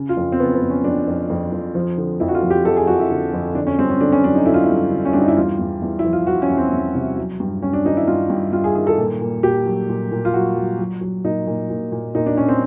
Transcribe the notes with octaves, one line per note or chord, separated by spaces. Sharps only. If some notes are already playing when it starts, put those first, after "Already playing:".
Already playing: C#3
F4
F2
C4
C#3 B3
B3
F2
C#4
F2 D4
F2
F2
F2
F3
D3
F2 E4
F#4
F4
F2
G4
F2 A4
G#4
F2 F#4
E4
D3
F2
D3 D4
C#4
G2 C4
C#4
D3 D4
C#4
F#3 D4
D#4
D3 E4
F4
E4
G2
D3
C#4
G2 D4
D#4
E4
E2 F4
E2
E2
E4
F3
F4
F3 F#4
C#4
E2
C4
E2
C3
F#3
G2
G2 C#4
D4
D#3 D#4
E4
G2 F4
G2
G2 F4
G#4
D#3 G#4
A4
A#2
A#2
A#2 G4
F#3
A#2
A#2
F4
F#3 F#4
F#3
F#3
F#3
A#2 D#4
A#2
A#2
A#2
A#2 D#4
D4
A#2 C#4
C4